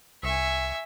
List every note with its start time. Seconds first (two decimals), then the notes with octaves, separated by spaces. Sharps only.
0.23 C2 E5 G#5 C#6